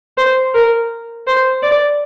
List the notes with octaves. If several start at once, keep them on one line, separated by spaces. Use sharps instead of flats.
C5
A#4
C5
D5